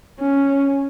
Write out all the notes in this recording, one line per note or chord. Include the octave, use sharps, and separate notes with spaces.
C#4